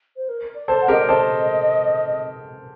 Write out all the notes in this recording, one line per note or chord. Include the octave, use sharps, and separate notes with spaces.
C5
A#4
D5
A4 C5
F#5
G4 A#4 D#5
D5
A4 C5 D#5